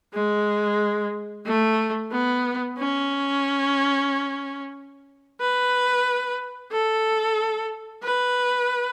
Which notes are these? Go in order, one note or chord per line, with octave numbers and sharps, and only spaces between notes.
G#3
A3
B3
C#4
B4
A4
B4